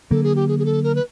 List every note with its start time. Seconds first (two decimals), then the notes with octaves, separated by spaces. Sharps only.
0.10 D3 F#3 A#3 A4
0.23 G#4
0.35 G4
0.48 G#4
0.59 G#4
0.65 A4
0.84 A#4
0.95 B4